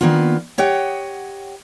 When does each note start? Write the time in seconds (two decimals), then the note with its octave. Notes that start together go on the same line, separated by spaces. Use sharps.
0.01 D#3 A#3 B3 D4 F4
0.58 G4 C#5 D#5 F#5 G5